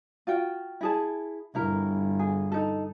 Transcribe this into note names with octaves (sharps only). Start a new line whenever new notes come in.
F4 F#4 G5
E4 G#4 A5
G1 E4 A#4
G#4
D#4 A4